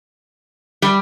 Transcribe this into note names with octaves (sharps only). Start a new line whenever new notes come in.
G3